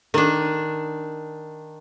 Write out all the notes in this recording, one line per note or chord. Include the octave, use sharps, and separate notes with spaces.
D#3 D4